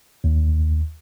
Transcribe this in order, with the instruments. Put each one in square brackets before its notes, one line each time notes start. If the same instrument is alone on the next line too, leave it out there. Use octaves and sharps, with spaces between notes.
[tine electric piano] D#2